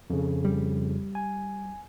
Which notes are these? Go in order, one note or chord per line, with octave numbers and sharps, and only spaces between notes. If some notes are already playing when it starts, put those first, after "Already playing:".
F2 C#3
G3
G#5